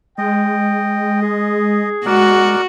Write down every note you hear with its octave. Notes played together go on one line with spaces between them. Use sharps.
G#3 D#5 G5
G#4
G#3 F#4 A#4 D5 F#5